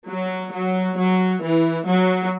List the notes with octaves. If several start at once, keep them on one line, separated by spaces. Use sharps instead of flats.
F#3
F#3
F#3
E3
F#3